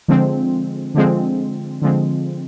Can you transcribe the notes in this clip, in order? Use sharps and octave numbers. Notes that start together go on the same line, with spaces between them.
D3 F3 G#3 C4
D3 F3 G#3 C4
D3 F3 G#3 C4